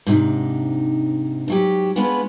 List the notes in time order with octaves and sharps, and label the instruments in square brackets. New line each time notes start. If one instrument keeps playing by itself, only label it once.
[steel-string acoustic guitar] G#2 C3 D4 D#4
G#2 F#3 G4
G#3 B3 C#4 D4 F4 B4